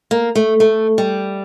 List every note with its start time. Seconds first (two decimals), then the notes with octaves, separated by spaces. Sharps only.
0.11 A#3
0.35 A3
0.60 A3
0.98 G3